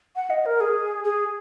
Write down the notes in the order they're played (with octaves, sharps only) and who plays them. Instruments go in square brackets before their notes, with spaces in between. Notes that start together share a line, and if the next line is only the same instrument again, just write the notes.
[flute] F#5
D#5
A#4
G#4
G#4